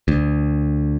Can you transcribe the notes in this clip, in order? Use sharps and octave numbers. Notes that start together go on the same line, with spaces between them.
D2